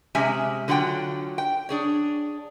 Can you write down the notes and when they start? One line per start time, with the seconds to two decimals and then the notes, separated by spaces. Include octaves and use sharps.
0.15 C3 G#3 C#4 G4 E5 G#5
0.68 D3 F#3 F4 F#5 G5
1.38 G5
1.69 D4 G#4 C#5